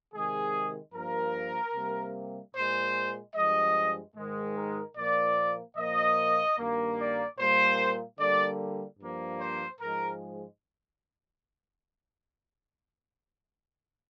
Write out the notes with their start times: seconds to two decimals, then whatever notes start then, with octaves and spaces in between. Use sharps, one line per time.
0.13 C3 D#3 G#3 G#4
0.93 G2 F3 A#3 A#4
1.74 C3 G3 A#3
2.55 A#2 G#3 C5
3.35 G2 F3 G#3 D#5
4.16 G#2 D#3 G#3
4.56 A#4
4.96 A#2 F3 A#3 D5
5.77 A#2 F3 A#3 D#5
6.58 G2 D#3 A#3
6.98 D5
7.39 A#2 G3 A#3 C5
8.19 D3 G3 A#3 D5
8.99 G2 F3 A#3
9.40 C5
9.80 G#2 F3 G#3 A#4